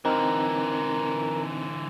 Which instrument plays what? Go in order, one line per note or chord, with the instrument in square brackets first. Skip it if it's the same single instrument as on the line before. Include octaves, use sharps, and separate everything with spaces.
[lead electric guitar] D3 E3 [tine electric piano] C4 D#4 [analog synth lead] A#4